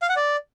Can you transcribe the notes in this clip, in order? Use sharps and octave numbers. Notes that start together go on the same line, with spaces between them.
F5
F#5
D5